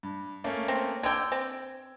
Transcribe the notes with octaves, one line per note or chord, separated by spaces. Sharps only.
G2
A3 A#3 C#4
C4
D3 G5 E6 G#6
C4